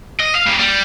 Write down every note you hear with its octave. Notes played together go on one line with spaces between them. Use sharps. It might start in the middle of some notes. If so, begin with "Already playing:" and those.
D#5
F5
A#2 G3
G3